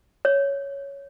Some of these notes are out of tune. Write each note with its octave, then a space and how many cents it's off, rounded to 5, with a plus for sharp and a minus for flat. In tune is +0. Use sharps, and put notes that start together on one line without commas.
C#5 +5